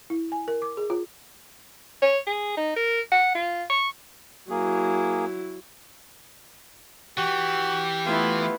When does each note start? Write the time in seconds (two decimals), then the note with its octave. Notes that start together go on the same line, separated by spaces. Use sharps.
0.10 E4
0.32 G#5
0.48 A#4
0.62 D6
0.77 G#4
0.90 F4
2.02 C#5
2.27 G#4
2.57 D#4
2.77 A#4
3.12 F#5
3.35 F4
3.70 C#6
4.50 F#3 A#3 E4 G#4
7.18 E3 F#4 G4
8.06 A3 B3 E4 F4